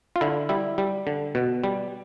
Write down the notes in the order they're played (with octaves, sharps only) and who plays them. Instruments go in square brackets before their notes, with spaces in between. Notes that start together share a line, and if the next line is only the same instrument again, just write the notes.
[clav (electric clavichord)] F4
D3 E4
G3 E4
G3
D3
B2
G3